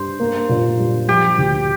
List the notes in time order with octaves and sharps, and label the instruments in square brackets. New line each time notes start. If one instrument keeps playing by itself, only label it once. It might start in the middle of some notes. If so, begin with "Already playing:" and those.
Already playing: [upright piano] G2 [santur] C5
[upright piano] A#3
A#2
G3
[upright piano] F3 [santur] G4
[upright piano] D2